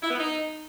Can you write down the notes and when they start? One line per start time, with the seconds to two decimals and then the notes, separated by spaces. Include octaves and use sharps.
0.03 E4
0.10 B3
0.18 D#4